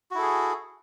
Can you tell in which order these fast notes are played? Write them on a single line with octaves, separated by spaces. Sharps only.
F#4 E4 A4 G#4